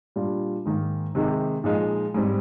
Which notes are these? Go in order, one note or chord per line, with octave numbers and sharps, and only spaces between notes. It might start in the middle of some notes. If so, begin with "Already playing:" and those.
A#2 G3 D4 F4
G#2 D#3 A#3
C3 D#3 G#3 D#4 G4
A#2 F3 G#3 D#4
G#2 G3 C4